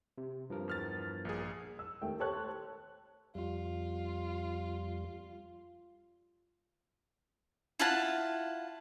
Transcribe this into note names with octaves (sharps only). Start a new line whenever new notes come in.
C3
G2 F3 A#4
E2 F6 A6
A#1 G#4
E6
D#2 A3 G5
G4 A4 C5 C#5 A5 F#6
F2 G3 F4
E4 F4 F#5 A5